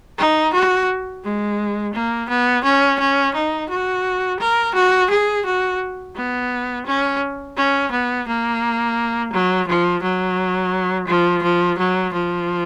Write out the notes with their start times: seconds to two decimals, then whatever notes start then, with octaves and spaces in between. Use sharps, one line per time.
0.18 D#4
0.54 F#4
1.24 G#3
1.94 A#3
2.29 B3
2.64 C#4
3.00 C#4
3.35 D#4
3.70 F#4
4.40 A#4
4.75 F#4
5.11 G#4
5.46 F#4
6.16 B3
6.86 C#4
7.57 C#4
7.92 B3
8.27 A#3
9.33 F#3
9.68 F3
10.03 F#3
11.08 F3
11.43 F3
11.78 F#3
12.13 F3